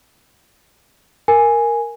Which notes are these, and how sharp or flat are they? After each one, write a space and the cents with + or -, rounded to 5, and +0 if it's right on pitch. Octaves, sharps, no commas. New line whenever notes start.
A#4 +0 G#5 +0